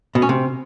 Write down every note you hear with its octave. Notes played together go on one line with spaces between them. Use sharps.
B2
C#4
C3